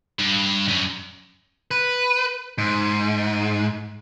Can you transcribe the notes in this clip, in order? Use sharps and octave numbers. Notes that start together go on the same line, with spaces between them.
G2
F#2
B4
G#2